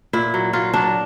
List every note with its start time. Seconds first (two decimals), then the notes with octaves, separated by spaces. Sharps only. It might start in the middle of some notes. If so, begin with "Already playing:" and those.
0.13 A#2 E4
0.34 F#3
0.53 F#3 F4
0.74 F#3 D4